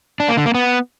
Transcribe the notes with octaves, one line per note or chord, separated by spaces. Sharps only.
D4
A#3
D3
A#3
B3